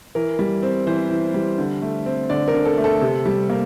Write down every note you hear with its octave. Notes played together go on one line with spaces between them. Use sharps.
E3 A#4
G3
C4
E3 C5
E3
G3
D3
A3
C4
D3 D5
A#4
D3
A4
A3
A4
C3
G3
A#3